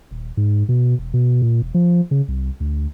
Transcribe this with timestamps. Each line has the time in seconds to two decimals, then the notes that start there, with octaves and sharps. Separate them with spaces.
0.11 D#1
0.37 G#2
0.69 B2
0.99 E1
1.14 B2
1.42 A#2
1.62 E1
1.74 F3
2.11 C#3
2.28 C2
2.60 D2